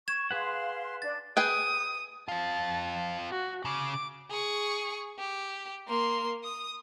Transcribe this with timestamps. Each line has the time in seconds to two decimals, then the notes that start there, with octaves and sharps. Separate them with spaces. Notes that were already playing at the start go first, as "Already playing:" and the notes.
0.08 C#6 G#6 E7
0.31 G#4 B4 F5 F#5 C6
1.02 D4 D5 A6
1.37 G#4 B4 G5 D#6
2.28 C4 F4 A5
3.31 F#4
3.65 C#3 D6
4.31 G#4 C#6
5.19 G4
5.87 A#3 C6
6.44 D#6